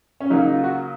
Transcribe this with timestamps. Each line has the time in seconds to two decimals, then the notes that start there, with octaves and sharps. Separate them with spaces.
0.20 C#4
0.30 C#3 F#3 A#3 D#4
0.41 D#4
0.53 F4
0.64 F#4